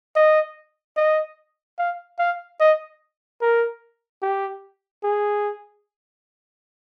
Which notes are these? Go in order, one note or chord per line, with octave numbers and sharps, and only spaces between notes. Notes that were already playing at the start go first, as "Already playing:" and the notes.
D#5
D#5
F5
F5
D#5
A#4
G4
G#4